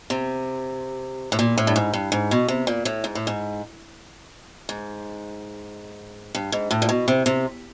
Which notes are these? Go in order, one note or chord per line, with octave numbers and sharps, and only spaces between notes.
C3
A2
A#2
A2
G2
G#2
G2
G#2
B2
C3
A#2
A2
G#2
A2
G#2
G#2
G2
G#2
A2
A#2
B2
C3
C3